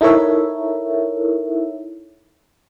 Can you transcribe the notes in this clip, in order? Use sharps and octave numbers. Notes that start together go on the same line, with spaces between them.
D#4 E4 A4 A#4 C#5 E5